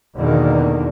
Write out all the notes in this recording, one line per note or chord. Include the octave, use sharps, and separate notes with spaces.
E2 B2 D3 D#3 A#3